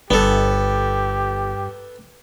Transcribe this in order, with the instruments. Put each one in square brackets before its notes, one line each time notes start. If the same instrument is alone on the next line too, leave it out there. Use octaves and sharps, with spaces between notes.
[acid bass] G1 [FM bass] G2 [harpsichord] B3 A4 [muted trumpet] G4